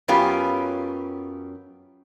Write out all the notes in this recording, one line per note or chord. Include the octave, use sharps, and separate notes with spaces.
F#2 F#3 B3 C#4 F4 G4